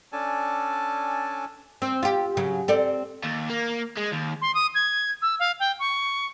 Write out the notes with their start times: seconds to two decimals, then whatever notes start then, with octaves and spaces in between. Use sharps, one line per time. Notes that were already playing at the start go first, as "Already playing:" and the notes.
0.13 C#4 D4 A4 D5 G#5 A5
1.82 C4
2.03 F4 G4
2.37 C#3 F#3
2.68 C4 A4 D5
3.23 D#2
3.50 A#3
3.97 G#3
4.12 D#2
4.41 C6
4.54 D#6
4.75 G#6
5.22 E6
5.39 F5
5.59 G5
5.79 C#6